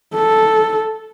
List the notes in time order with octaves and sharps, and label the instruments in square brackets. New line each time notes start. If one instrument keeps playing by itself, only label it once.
[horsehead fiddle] A4